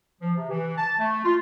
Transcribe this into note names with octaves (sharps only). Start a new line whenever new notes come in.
F3
C3
E3
A5
A3
F4